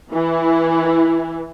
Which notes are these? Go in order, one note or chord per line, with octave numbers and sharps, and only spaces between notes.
E3 E4